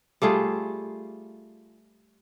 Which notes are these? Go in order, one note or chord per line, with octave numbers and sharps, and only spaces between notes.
G3 A3 F4 G#4